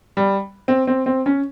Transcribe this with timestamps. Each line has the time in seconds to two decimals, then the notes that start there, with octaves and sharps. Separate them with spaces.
0.17 G3
0.68 C4
0.87 C4
1.06 C4
1.26 C#4